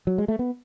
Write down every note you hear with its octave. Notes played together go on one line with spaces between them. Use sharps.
F#3
G#3
A3
B3